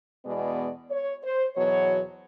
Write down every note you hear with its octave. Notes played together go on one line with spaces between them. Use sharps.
E2 B2 G#3 B3 D5
C#5
C5
E2 B2 F#3 C#5